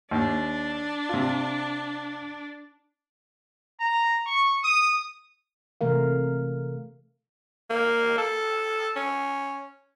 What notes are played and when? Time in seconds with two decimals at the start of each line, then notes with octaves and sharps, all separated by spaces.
0.11 D#2 D4
1.09 C3 F4
3.80 A#5
4.27 C#6
4.64 D#6
5.81 C3 E3 A3 A#4 F5
7.70 A#3
8.18 A4
8.96 C#4